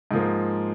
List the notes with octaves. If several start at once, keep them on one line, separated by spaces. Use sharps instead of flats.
G#2 F3 A#3